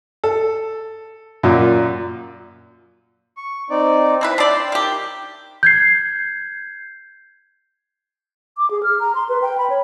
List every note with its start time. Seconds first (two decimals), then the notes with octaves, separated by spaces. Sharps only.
0.24 A4
1.43 F#2 A#2
3.37 C#6
3.70 C4 D#4 D5
4.21 C4 E4 B4
4.38 D4 D5 G5 C6 E6
4.72 D#3 G4
5.63 G6 G#6 C7
8.58 D6
8.71 G#4
8.83 F6
9.00 A#5
9.15 C6
9.29 B4
9.42 G5
9.58 B5
9.70 C#5